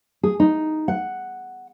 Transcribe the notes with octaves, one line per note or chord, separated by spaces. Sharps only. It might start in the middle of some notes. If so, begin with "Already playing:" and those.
G#4
D#4
F#5